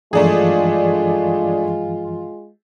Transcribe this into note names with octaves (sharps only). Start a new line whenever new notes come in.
G2 E3 F3 G#3 A3 D4 F4 G#4